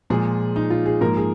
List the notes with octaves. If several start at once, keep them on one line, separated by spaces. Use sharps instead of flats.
A#2 F3 G#3 G#4
D#4
F4
G#4
G#2 F3 A#3 A#4
G#4